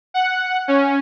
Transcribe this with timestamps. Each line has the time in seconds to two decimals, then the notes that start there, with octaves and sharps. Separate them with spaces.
0.14 F#5
0.68 C#4